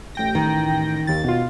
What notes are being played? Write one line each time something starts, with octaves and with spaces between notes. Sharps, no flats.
A1 G5 A#6
D#3
D#2 A6
B2 F4